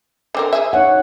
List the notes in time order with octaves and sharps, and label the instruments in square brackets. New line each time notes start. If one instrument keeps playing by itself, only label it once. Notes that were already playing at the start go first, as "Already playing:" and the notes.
[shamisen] D3 C4 A#4
G#4 E5
[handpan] D#4 C#5 F#5